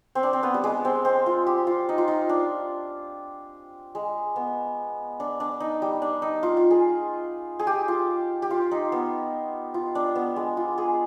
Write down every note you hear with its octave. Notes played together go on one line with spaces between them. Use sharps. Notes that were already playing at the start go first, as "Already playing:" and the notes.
C4
D4
C4
B3
G3
G#3
C4
C4
F4
G4
F4
D#4
F4
D#4
D4
G#3
B3
D4
D4
D#4
G3
D4
D#4
F4
F4
G#4
G#4
G4
F4
G4
F4
D#4
B3
F4
D4
B3
G#3
F4
G#4